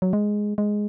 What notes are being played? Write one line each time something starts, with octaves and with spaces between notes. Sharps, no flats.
F#3
G#3
G#3